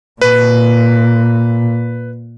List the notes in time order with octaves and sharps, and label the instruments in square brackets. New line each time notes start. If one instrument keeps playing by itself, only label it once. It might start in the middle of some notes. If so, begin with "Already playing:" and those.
[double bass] A#2 [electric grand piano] B4